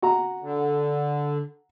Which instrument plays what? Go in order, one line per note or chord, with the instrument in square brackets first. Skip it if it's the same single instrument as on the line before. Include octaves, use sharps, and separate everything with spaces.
[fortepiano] F#4 A#5
[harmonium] D3